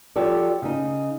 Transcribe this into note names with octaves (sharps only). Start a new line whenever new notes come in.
F3 F#4 G4 A4 C#5 D5
C#3 D#4